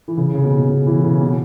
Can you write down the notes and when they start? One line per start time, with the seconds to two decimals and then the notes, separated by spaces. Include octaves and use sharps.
0.08 E3
0.17 C#3
0.34 C#3
0.44 B2
0.58 B2
0.69 C#3
0.86 E3
1.04 C#3
1.21 B2